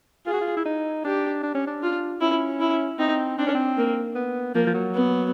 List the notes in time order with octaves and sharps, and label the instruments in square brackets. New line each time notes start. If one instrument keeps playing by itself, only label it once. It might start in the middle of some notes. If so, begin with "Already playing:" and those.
[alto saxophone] F4 [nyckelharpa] G#4
[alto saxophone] F#4
F4
E4
D#4
[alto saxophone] D4 [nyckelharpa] G4
[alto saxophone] D4
C#4
D4
[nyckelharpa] F4
[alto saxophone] C#4 [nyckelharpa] E4
[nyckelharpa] E4
[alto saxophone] C4 [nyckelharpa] D#4
[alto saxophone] C4 [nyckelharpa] D4
[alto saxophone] C#4
C4
[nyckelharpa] A#3
[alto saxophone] B3
[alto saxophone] F3 [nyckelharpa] A#3
[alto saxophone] F3
F#3
[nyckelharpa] B3